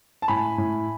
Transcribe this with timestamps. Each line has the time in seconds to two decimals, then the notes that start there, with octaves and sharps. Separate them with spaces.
0.22 A5
0.28 A2 G#5 B5
0.58 A2